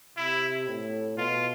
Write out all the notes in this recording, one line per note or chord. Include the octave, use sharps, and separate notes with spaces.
C3 E4
A2
B2 F4